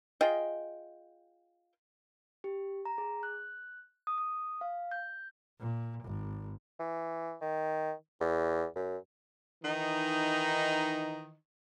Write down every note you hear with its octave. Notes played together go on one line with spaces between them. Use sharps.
F4 G#4 D#5 G5
G4
A#5
G#4
F#6
D#6
D#6
F5
G6
A#2
G#1
E3
D#3
E2
F#2
D#3 E3 D#4